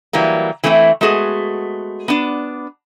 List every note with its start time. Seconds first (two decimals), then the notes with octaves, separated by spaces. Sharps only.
0.13 E3 F#3 G3 A#3
0.63 E3 A3 C4 D#4 E4
1.01 G#3 A3 B3 F#4 G#4
2.08 B3 D4